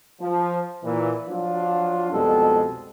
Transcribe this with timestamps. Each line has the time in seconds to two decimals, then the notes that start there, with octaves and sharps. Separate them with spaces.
0.20 F3
0.83 A#2 E3
1.28 F3 F#3 D4 F4
2.13 C2 F2 B2 G3 G#3 A4